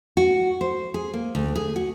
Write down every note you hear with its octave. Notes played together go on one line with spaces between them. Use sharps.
F#4
C5
G#4
A#3
D2
G#4
F#4